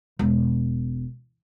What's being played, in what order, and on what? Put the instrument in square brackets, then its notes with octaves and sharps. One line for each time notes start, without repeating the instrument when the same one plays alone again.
[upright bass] E1